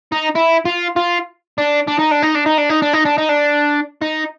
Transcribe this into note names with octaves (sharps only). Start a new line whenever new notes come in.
D#4
E4
F4
F4
D4
D4
D#4
D4
D#4
D4
D#4
D4
D#4
D4
D#4
D4
D#4
D4
D#4